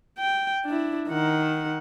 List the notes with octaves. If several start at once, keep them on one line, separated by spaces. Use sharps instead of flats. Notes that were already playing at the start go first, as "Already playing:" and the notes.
G5
D4 E4
D#3 F#5